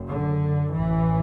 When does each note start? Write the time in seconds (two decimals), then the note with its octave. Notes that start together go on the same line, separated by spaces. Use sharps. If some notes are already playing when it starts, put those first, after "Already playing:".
Already playing: F#1 F#2
0.11 D3
0.72 A1 A2 E3